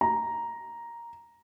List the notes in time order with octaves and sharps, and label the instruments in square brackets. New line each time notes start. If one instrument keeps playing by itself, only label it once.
[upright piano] A#5